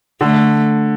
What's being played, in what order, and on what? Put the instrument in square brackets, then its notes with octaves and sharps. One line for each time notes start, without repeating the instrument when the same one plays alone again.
[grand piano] D3 [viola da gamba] A3